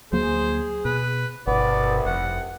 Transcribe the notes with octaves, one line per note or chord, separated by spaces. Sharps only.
D2 F#3 A#3 G#4 C5
B2 B4
G1 C2 B2 B3 D5
F1 F#5